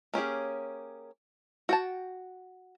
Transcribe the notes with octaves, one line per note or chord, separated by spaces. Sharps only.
A#3 C#4 G4 G#4
F#4 G5 A5